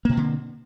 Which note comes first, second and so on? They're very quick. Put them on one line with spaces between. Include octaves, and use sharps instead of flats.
A#3 B2 C4 D3